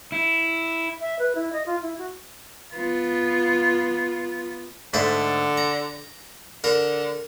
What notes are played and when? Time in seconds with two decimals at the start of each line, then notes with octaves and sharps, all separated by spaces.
0.12 E4
1.01 E5
1.19 B4
1.35 E4
1.53 D#5
1.66 F4
1.82 E4
1.98 F#4
2.72 B3 F4
4.94 G#2 D3 A3 C5
5.57 A#5
6.64 D3 A#4